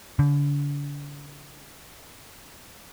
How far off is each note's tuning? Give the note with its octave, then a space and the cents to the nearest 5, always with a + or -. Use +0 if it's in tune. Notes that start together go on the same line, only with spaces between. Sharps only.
D3 -40